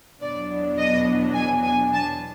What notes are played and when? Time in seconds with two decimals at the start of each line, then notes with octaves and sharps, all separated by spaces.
0.21 E2 B2 F#3 B3 D4 D5
0.78 D#5
1.35 G#5
1.63 G#5
1.93 A5